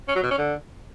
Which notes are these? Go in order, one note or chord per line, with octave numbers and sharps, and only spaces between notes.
C#4
F#3
B2
C#4
D3